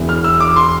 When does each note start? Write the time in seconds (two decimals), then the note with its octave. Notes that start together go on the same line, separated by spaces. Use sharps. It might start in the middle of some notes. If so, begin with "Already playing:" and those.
Already playing: E1 E2 E3
0.09 F6
0.24 E6
0.40 D6
0.56 C6